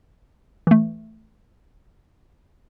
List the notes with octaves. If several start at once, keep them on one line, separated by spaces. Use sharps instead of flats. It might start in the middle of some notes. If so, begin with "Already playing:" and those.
E3 A3